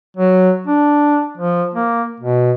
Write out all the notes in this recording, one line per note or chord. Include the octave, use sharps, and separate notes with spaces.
F#3
D4
F3
A#3
B2